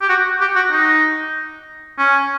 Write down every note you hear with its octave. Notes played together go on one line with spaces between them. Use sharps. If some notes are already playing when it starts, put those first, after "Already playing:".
G4
F#4
G4
F#4
D#4
C#4